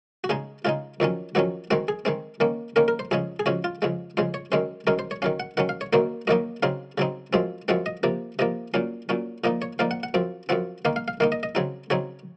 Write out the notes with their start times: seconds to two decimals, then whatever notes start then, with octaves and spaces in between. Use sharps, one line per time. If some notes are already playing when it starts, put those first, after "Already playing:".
0.24 F#4
0.29 C#3 G#3 D#4 G#4
0.65 C#3 G#3 D#4 F4
1.00 F2 D#3 F#3 C#4
1.35 F2 D#3 F#3 C#4 F#4
1.71 D#3 G#3 C4 F#4
1.88 G#4
2.05 D#3 G#3 C4
2.40 D#3 A#3 C#4
2.76 D#3 A#3 C#4 A#4
2.88 A#4
2.99 C5
3.11 F2 C#3 G#3 C#4 G#4
3.39 G#4
3.46 F2 C#3 G#3 C#4 F#4
3.64 F4
3.82 F2 C#3 G#3
4.17 F2 C#3 G#3 C5
4.34 C#5
4.52 F#2 D#3 G#3 C#4 C5
4.87 F#2 D#3 G#3 C#4 A#4
4.99 C5
5.11 C#5
5.22 D#3 F#3 C#4 F5
5.40 F#5
5.57 D#3 F#3 C#4 F#5
5.69 F5
5.81 C#5
5.93 F#2 D#3 F#3 A#3 D#4 C5
6.27 F#2 D#3 F#3 A#3 D#4 D#5
6.63 C#3 F#3 C4 D#4 F5
6.98 C#3 F#3 C4 D#4
7.33 F#2 F3 G#3 C4
7.68 F#2 F3 G#3 C4 F#5
7.86 D#5
8.03 C3 F3 A#3
8.39 C3 F3 A#3 D#5
8.74 A#2 F#3 C#4 F5
9.09 A#2 F#3 C#4
9.44 A#2 F3 A#3 D#4 D#5
9.62 C#5
9.79 A#2 F3 A#3 D#4 F5
9.91 F#5
10.03 F#5
10.14 F#2 F3 C4
10.49 F#2 F3 C4 F#5
10.85 D#3 A#3 D#4 F5
10.96 F5
11.08 F5
11.20 D#3 A#3 D#4 F5
11.32 D#5
11.43 D#5
11.55 C#3 F#3 C4 D#4
11.90 C#3 F#3 C4 D#4 C#5